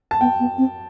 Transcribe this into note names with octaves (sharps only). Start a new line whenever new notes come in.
A5
B3 G5
B3
C4